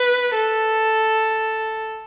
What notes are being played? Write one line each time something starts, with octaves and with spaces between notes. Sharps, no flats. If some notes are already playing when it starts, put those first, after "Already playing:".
Already playing: B4
A4